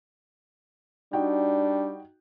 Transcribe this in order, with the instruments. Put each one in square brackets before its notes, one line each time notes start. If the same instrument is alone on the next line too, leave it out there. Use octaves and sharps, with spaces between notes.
[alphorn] G3 [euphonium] D4 [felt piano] D#4 F#4 G5